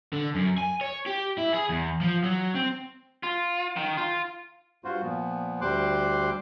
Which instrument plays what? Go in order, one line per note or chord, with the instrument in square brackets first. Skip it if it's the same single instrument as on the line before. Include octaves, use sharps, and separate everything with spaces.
[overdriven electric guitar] D3
F#2
G#5
C#5
G4
E4
G#4
E2
F3
F#3
C4
[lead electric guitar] F4
D#3
F4
[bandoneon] G2 F4 F#4 C5
A#2 F3 B3
D2 G3 C5 C6 D6 F#6